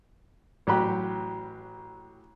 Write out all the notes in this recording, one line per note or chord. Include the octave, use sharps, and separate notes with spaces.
A1 F#3 G4 F#5 B5